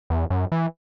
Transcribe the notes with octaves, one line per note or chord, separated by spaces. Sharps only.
E2
F#2
E3